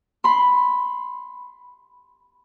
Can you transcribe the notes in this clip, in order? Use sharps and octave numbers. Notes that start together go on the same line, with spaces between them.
B5 C6